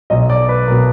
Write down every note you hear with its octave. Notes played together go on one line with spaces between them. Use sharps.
B1 B2 D#5
D5
B4
B1 B2 A#4